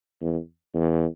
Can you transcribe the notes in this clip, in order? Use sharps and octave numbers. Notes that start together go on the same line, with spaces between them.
E2
E2